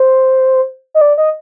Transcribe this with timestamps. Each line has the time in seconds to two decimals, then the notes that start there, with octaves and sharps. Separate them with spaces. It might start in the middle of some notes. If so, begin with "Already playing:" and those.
Already playing: C5
0.94 D#5
1.01 D5
1.18 D#5